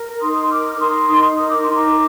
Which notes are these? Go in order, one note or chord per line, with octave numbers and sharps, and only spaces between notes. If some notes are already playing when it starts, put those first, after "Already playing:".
Already playing: A#4
D#4 C6 D#6
A#4 D6 F6
A#4 C6 D#6
D#4
A#4 D#6
D6
C6
D#4
A#5 D6